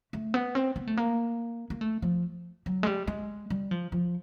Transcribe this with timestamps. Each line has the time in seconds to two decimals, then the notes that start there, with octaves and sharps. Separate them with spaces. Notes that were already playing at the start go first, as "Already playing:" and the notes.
0.13 A3
0.34 B3
0.55 C4
0.76 B3
0.87 A3
0.97 A#3
1.70 A#3
1.81 A3
2.02 F3
2.66 F#3
2.83 G#3
2.87 G3
3.08 G#3
3.50 G3
3.71 F3
3.92 F3